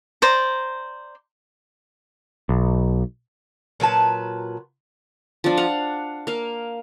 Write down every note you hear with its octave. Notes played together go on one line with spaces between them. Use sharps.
C5 D5 A#5
B1
A#2 F#3 B4 A5
F3 D4
F5 F#5
A#3 F5